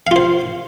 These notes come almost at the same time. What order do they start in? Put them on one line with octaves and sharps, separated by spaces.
F5 F4 C5